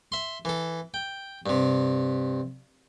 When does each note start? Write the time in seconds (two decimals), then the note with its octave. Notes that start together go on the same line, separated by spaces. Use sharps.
0.12 E5 C6
0.45 E3 A4
0.94 G5
1.46 G2 C3